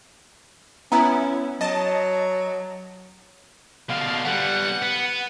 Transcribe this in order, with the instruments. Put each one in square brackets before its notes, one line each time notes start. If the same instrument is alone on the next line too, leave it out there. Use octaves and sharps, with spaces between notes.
[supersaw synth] B3 E4 [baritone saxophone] C#4 [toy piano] A#5 D#6
[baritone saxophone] F#3 [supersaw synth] D#5 A5
[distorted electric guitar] B2 D3 [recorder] F5
[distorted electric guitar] G3 B3 [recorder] F#5
[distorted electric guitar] B3